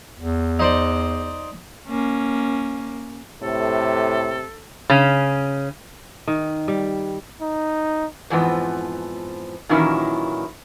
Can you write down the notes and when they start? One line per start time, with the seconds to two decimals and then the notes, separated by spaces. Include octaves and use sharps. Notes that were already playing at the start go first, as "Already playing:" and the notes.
0.19 E2
0.59 D#4 C5 D5
1.88 A#3 C#4
3.42 A2 C3 A4
4.90 C#3 C#4
6.27 D#3
6.68 G3
7.42 D#4
8.30 F2 G#2 E3 F3 B3
9.69 A#2 D#3 E3 F#3 C#4 E4